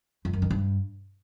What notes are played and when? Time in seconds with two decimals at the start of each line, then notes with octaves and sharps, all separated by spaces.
0.25 F2
0.33 F#2
0.42 D#3
0.50 G2